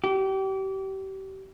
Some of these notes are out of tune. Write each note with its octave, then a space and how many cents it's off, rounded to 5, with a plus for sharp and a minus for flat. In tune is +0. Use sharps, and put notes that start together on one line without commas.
G4 -30